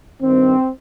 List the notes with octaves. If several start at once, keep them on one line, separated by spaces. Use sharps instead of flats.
G2 D#3 C4